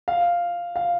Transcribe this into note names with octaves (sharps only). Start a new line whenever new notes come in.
F5
F5